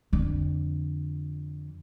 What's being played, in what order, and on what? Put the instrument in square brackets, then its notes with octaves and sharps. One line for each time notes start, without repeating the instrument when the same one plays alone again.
[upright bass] F2 D3